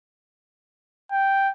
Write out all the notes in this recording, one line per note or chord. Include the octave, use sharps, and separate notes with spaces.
G5